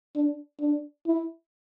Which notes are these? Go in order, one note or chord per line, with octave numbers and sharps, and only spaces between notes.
D4
D4
E4